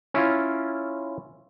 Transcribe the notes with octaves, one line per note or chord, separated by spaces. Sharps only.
C#4 E4 F4